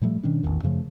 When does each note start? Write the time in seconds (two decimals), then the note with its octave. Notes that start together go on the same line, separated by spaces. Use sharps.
0.01 A#2 F3 G3 A3
0.23 B2 D#3 C#4 D4
0.43 A1 E2 A2 D#3
0.63 F#2 C#3 F3 A3